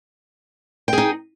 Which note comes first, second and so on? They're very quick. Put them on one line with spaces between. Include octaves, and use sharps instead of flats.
G5 G#4 D#4